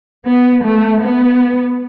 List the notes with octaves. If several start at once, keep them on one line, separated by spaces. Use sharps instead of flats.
B3
A3
B3